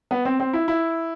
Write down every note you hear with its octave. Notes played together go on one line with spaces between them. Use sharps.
B3
C4
C4
E4
E4